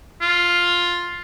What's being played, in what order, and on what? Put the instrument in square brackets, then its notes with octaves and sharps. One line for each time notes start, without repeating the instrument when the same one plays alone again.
[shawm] F4